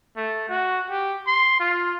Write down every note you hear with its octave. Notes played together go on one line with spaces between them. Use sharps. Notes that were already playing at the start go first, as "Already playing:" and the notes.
A3
F#4
G4
C6
F4